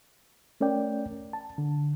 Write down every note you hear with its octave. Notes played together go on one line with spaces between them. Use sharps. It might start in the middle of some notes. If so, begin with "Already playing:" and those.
A3 C#4 A#4 D5 G5
A5
D3